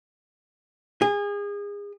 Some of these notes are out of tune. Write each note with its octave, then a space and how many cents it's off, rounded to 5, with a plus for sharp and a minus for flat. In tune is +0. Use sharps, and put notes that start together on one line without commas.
G#4 -30